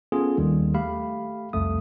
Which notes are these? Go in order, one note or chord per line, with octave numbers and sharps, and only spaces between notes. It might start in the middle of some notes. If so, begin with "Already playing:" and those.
B3 C#4 F4 G#4 A4
D#2 D#3 G3
A3 G4 F5 B5
C2 F2 A3 D#6